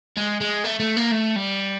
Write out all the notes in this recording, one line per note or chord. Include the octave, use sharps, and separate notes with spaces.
G#3
G#3
A3
A3
A#3
A3
G3